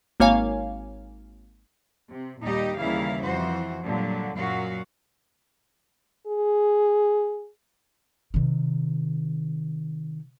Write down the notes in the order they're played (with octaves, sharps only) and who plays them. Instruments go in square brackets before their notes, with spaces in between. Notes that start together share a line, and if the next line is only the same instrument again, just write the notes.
[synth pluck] G#1 A#3 C#5 F5 G#5
[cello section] C3
D#2 A#2 G3 D#4 G4 D#5
D#2 C#3 E3 G3 E4 F5
F2 E3 F#4 C5
A#2 D3 F#3 G3
F#2 A#2 F#3 F#4 F5
[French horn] G#4
[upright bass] C3 D#3